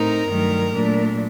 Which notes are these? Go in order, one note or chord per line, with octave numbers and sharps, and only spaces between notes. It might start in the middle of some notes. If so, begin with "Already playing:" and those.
Already playing: A2 A3 C4 D#4 A#4
G2 D#3 F#3 A3
A#2 F#3 A3 D4